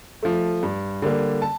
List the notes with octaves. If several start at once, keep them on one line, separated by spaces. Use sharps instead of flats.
F3 A3
G2
D3 G3 A#3
A5